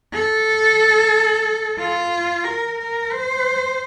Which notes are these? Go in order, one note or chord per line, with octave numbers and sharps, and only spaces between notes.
A4
F4
A#4
A#4
C5